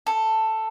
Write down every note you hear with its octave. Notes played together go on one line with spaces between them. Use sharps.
A4